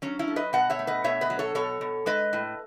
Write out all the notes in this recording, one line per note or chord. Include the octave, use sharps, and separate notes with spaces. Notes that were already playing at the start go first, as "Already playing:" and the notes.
F#3 C#4
C#4 E4
A3
B4 D#5
B2 D#5 F#5
C#5 E5
A3
B4 D#5
B2 C#5 E5
B4 D#5
F#3
A4 C#5
B2 A4 C#5
B2
G#3 B4 D#5
A2